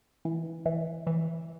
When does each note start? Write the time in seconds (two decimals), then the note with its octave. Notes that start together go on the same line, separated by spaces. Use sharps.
0.25 E3
0.66 E3
1.07 E3